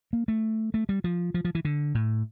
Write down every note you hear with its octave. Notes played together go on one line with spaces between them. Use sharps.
A#3
A3
A3
G3
F3
F3
F3
E3
D3
A2